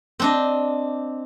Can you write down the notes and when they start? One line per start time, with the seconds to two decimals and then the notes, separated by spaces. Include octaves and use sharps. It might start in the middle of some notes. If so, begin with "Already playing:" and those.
0.20 C4 D4 D#5